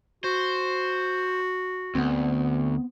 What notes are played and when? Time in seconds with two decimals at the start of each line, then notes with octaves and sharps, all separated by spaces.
0.24 F#4 C5
1.95 D2 B3 C4